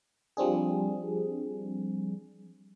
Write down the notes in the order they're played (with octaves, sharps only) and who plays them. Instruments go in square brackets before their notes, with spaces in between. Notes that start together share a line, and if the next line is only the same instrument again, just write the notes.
[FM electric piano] F3 G3 C4 D4 G#4